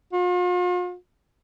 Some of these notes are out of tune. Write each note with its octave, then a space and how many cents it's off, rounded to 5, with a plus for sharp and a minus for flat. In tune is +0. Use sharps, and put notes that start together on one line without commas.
F4 +45